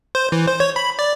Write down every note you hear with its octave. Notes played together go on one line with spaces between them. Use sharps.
C5
E3
C5
C#5
B5
D5